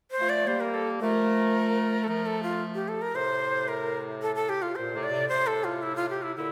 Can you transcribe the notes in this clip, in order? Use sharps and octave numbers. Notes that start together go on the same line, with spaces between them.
C5
F3 A3
D5
G3 A#3 C5
A#4
A4
F3 A3 A#4
A4
F3 A3 A#4
A4
F4
G4
A4
A#4
A2 C3 C5
A#4
A4
A4
G4
F4
A#2 C5
A2 C3
D5
A2 C3
A2 C3 C5
A4
F4
E4
F4
G4
E4
A#2 D3 E4